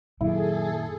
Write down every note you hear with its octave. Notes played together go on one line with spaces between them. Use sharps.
F#2 A#2 D#3 F#3 E4 G#4 A4